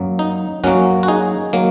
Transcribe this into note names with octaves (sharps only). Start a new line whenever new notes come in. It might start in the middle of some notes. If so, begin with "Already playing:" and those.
Already playing: F#2 F#3 A#3
D#4
F#2 F#3 A#3 C#4 F#4
F#4
D#4 G#4
F#3 A#3